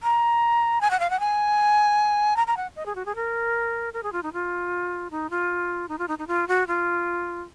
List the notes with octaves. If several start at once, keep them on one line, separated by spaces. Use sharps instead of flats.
A#5
G#5
F#5
F5
F#5
G#5
A#5
A#5
F#5
D#5
G#4
F#4
G#4
A#4
A#4
G#4
F4
D#4
F4
D#4
F4
D#4
F4
D#4
D#4
F4
F#4
F4